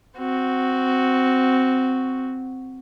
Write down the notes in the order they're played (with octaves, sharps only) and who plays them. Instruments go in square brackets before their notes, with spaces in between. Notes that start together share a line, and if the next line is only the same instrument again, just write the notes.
[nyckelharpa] C4 F#4